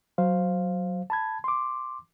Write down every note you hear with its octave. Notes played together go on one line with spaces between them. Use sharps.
F#3 C5 F5
A5 B5 G#6
C6 D6